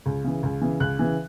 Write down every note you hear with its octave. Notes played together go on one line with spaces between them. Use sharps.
C#2
C#3 E3
C#2
C#3 E3
C#2 F#6
C#3 E3